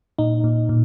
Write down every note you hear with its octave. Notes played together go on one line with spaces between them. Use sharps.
A#2 D#4
A#2
A#2